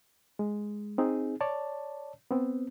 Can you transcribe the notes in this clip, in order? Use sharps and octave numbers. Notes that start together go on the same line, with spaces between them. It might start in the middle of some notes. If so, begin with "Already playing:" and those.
G#3
C4 D#4 G#4
C#5 D5 A5
B3 C4